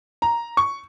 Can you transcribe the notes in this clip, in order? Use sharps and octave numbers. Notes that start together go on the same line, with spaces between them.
A#5
C#6